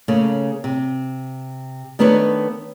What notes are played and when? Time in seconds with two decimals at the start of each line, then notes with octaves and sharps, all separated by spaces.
0.08 C#3 A3 A#3 C#4
0.64 C3
1.99 D#3 A3 B3 D4 B4 C#5